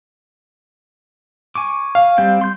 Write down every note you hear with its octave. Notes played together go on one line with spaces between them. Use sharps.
G#5 C#6 D6
F5
G3 C4 G5
C6 G6